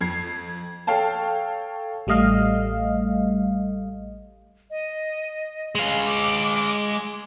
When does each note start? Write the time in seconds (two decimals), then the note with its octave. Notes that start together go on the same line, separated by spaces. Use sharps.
0.01 F2 G#6 C7
0.87 A4 C#5 F5 G5 A5
2.07 A1 G3 A3 D#5 F5
4.70 D#5
5.75 G#3 F5 G#5
6.05 D6